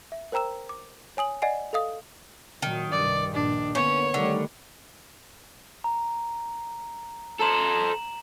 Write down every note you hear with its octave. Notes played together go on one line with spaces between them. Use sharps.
E5
A#4 C5 G5 A#5 E6 E7
D6
C#5 G#5 D#6 F#7
D5 D#5 F#5 G#5 C7
A4 D#5 F5 D#6
A#2 D#3 F#3
C2 G2 D5
A#1 D4
D3 A#3 B3 C#4 C#5
D3 D#3 G3 A3
A#5
A4 C5 A#5 E7 F#7